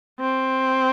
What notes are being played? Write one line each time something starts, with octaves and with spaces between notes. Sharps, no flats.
C4